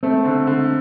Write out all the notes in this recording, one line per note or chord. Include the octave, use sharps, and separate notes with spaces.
A3 C4
D3
D3